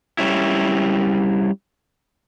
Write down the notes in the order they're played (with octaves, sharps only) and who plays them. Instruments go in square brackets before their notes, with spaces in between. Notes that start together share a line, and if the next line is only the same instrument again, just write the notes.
[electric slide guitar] G3 C#4 E4